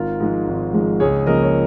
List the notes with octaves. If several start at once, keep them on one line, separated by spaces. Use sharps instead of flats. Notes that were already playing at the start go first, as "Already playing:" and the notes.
Already playing: G#1 F4 A#4
G#2 F3 G#3
G#1
G#2 F3 G#3
C#2 G#4 C#5
C#3 F3 A#3 A#4 D#5
C#5